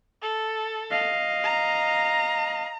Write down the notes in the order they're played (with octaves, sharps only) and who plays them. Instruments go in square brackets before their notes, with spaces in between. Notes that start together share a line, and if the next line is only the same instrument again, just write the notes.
[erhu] A4
[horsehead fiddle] D#5 F5
[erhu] A#5